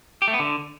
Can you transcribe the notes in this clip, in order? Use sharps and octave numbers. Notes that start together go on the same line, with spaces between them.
G4
A3
B3
D3